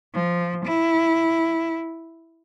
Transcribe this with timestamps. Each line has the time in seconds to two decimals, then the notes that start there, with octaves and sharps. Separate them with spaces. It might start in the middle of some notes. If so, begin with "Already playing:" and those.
0.14 F3
0.65 E4